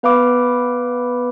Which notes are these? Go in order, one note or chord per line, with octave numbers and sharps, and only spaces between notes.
B3 B4 F5 B5 D6